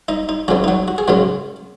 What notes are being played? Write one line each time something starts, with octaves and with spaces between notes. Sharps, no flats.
D#4 D#5
D#4
C#2 C#3 F#3 C#4 F#4
D#4
F#3 F#4
F#4
G#4
F#2 C#3 F#3 G#3 C#4 F#4